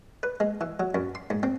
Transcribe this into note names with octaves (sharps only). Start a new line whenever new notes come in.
B4
G#3
E3
F#3
F#2
C6
G#2
C4